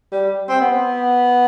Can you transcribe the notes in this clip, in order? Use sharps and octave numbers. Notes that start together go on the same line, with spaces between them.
G3
C4
B3